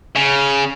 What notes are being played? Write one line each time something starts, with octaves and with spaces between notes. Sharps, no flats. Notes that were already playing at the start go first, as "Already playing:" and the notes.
C#3